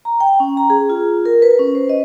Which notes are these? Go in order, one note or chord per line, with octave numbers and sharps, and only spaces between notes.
A#5
G5
C#4
A#5
G#4
F4
A#4
B4
C#4
C5
D#5